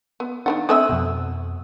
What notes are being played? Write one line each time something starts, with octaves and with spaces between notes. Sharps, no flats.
B3
D#3 E3 D4 F#5
A3 C4 E5 G#5 D#6 F#6
F2 B2